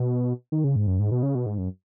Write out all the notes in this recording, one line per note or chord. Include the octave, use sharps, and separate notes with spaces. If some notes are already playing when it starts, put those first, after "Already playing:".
Already playing: B2
D#3
C#3
G#2
F#2
G#2
B2
C#3
B2
G#2
F#2